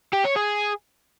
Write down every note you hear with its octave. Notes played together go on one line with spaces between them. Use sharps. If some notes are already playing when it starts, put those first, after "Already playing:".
G4
C#5
G#4